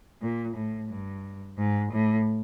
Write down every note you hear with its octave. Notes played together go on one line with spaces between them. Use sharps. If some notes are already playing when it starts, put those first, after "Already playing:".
A#2
A2
G2
G#2
A2